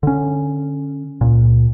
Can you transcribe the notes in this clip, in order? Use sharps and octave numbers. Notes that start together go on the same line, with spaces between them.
D3 C#4
C#2 A#2